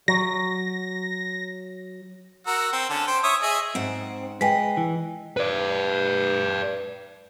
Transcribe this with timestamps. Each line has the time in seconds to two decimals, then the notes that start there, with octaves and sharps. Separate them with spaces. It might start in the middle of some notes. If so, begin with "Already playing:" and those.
0.08 F#3 A#6
2.47 F#4 A#4 E6
2.73 C4
2.90 D3 C#4 A5
3.07 C5 G5
3.23 C#5 E5 D#6
3.43 G#4 D#5 E5
3.75 G#2 C4 F#5
4.41 G#3 B4 D#5 G5 G#5 B6
4.77 E3
5.37 B4 D5